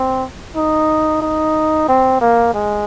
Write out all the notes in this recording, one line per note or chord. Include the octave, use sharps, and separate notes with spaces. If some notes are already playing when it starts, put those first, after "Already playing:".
Already playing: C4
D#4
D#4
C4
A#3
G#3